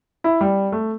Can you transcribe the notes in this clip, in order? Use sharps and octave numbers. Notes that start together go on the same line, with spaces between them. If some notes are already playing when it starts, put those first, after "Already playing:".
E4
G3
A3